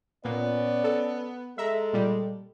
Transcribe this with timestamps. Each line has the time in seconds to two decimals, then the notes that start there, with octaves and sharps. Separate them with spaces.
0.25 A#2 B3 C#4 D5
0.84 A4
1.58 G#3 A4 E5 A#5
1.93 A#2 G3